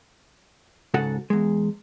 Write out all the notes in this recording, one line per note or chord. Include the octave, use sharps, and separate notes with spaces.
G#2 C#3 F#4 A4 F#5
E2 G#3